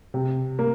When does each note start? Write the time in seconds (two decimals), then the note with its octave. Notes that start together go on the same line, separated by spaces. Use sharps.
0.14 C3
0.59 A#3